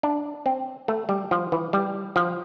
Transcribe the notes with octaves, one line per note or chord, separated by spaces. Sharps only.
D4
C4
A3
G3
F3
E3
G3
F3